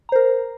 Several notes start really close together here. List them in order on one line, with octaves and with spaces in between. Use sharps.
A#5 C5 A#4